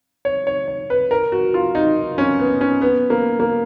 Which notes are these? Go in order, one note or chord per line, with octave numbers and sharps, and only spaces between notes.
C#5
C#5
C#5
B4
A#4
F#4
F4
D#4
C#4
B3
C#4
B3
A#3
A#3